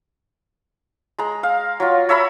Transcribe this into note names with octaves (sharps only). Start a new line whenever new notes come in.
G#3 A#5
F5
F#3 F4
C#5 E5 A#5 B5